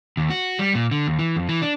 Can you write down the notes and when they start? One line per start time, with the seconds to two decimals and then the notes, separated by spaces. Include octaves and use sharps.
0.17 D#2
0.30 F#4
0.59 G3
0.75 A#2
0.91 D3
1.08 D#2
1.19 E3
1.37 F2
1.49 E3
1.62 D4